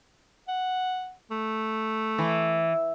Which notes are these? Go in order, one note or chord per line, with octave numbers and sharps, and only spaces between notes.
F#5
A3
E3